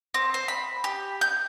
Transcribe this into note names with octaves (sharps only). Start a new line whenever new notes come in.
C4
C5
B5
G4
G6